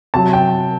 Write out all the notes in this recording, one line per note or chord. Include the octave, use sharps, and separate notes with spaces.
C3 F#3 A5
G5